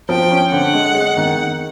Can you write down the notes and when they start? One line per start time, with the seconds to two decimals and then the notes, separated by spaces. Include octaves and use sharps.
0.09 F3 G5
0.31 C#4
0.52 D3 F#5
0.73 G#3
0.95 G#3
1.17 D#3
1.38 D#3